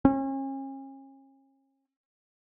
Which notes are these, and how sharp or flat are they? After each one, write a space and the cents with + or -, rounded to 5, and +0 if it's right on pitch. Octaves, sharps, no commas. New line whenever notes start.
C#4 -40